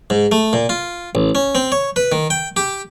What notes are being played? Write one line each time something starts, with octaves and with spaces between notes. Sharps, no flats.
G#2
A3
A#2
F4
A1
C#4
C4
C#5
B4
D#3
G5
G4